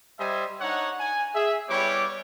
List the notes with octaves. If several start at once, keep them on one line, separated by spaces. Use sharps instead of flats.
G3 C5 D#5 E5 G#5
D4 D#4 C#5 F#5
G#5
G#4 E5
G3 B3 E4 G4 C#5 D6